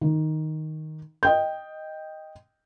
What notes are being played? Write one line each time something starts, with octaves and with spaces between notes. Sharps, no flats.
D#3
D#5 G5 G6